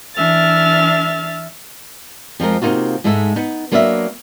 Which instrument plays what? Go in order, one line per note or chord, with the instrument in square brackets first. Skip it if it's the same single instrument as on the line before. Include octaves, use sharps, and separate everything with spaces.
[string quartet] E3 D4 E5 F6 A6
[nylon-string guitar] F2 F3 G#3 A#4
C3 A#3 D#4 F4 F#4
G#2 G#3 D#4 A4 C5 E5
B3 D#4
F#3 A#3 B3 D4 C#5 E5